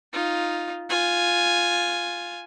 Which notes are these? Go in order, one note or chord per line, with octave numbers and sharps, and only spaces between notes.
D#4 F4
F4 G#5